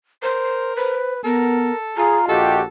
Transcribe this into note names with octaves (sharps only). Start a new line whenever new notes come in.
A#4 C5
B4 C5
B3 A4 A#4
F4 G#4 A#5
A#1 F#4 G4 A4 D#5